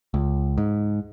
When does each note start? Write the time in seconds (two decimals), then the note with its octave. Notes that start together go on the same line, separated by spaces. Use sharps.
0.14 C#2
0.58 G#2